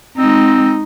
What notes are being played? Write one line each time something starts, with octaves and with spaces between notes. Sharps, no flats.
G#3 C4 D#4